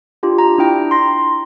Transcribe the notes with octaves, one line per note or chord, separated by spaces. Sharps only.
D4 F4 G4
A#5
D4 E4 G5 A#5
C6 A#6